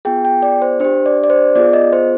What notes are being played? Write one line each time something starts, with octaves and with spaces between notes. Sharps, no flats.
B3 F4 G#4 G5
G5
D5
C5
D4 G4 C5
D5
D5
C5
B3 F4 G#4 D5
D#5
C5